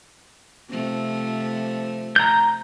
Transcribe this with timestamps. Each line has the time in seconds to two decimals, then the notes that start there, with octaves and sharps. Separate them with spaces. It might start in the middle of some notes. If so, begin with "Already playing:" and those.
0.68 C3 F3 A3
2.16 A#5 G6